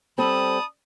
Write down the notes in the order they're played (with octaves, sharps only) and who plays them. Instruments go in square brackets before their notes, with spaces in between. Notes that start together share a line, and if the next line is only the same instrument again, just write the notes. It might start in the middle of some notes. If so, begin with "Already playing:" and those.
[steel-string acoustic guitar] G3 C4 A4 [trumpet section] A5 D#6 [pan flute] B5